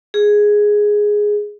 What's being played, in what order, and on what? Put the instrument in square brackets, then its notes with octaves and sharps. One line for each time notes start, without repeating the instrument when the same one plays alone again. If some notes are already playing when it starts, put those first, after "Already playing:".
[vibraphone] G#4